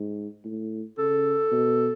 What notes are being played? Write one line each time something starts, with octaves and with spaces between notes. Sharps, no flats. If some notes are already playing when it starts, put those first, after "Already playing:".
Already playing: G#2
A2
C#3 A4
B2